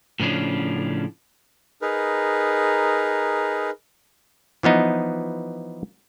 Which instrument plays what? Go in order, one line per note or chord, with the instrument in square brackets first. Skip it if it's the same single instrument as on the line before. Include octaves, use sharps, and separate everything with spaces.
[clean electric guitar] A2 C#3 F3 C#4 D4
[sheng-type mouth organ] D#4 G#4 A#4 B4
[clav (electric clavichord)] E3 F3 B3 D#4